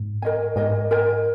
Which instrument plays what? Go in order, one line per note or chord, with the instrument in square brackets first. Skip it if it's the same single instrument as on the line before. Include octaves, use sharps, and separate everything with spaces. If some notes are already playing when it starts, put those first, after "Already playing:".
Already playing: [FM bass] G#2
[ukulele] A#4 D#5 G#5
[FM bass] G#2 [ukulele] A#4 D#5 G#5
[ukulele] A#4 D#5 G#5